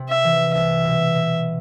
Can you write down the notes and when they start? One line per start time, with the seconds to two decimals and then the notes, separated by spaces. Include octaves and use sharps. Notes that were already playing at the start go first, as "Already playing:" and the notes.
Already playing: C3
0.09 E5
0.24 E3
0.54 C2 E5
0.85 B2
1.15 B2